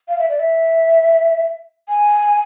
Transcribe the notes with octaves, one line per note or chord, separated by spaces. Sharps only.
F5
E5
D5
E5
G#5